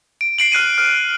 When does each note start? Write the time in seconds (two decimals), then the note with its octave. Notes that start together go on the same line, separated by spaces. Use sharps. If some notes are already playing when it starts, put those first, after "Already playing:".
0.21 D7
0.38 C7 D7 F#7
0.52 F6 F#6 C7 D#7
0.78 F6